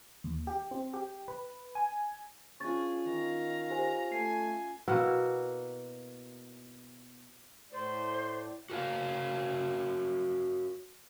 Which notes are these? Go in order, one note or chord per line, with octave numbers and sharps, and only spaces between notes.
D#2
G4
C4
G4
B4
G#5
C#4 D4 F4 G#4 C#6 A6
D#3 F5 A#5
G4 C5 G#5
A3 G#5 C7
B2 A#3 E4 F#4
A2 A3 C5 D5
F#4 A#4 C#5 F5